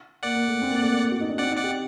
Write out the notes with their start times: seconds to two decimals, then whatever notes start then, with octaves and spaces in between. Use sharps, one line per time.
0.23 A#3 D5 F#5
0.35 A#3
0.48 A3
0.62 C4
0.71 A#3
0.82 A3
0.92 A#3
1.12 F#4
1.21 D#4
1.29 D4
1.38 C4 D5 F#5
1.51 D#4
1.57 D5 F#5
1.64 G4